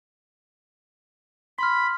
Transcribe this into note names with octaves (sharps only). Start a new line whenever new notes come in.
B5 C6 F6